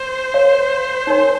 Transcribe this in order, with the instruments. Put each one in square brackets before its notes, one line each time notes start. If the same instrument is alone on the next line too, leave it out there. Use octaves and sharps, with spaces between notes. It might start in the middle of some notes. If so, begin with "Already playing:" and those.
Already playing: [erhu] C5
[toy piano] A#4 C#5 F5
D#4 A#4 C#5 G#5 C6